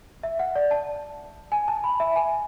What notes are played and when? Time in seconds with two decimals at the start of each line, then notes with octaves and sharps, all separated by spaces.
0.23 E5
0.39 F#5
0.56 D5
0.71 A5
1.52 G#5
1.68 A5
1.84 B5
2.00 E5
2.16 G#5